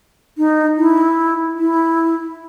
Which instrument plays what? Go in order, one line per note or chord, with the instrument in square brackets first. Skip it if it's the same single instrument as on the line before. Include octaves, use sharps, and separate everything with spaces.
[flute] D#4
E4
E4